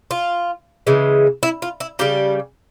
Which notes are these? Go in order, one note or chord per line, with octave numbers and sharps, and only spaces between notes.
F4
C#3 E3 G#3
E4
F4
E4
C#3 G3 G4